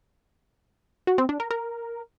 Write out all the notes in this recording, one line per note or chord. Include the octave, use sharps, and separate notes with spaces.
F#4
C4
D4
A#4
A#4